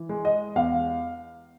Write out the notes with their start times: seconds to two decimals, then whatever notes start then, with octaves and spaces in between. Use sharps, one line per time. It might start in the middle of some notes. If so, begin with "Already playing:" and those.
Already playing: E3
0.09 G#3
0.25 D#5
0.56 E2 F5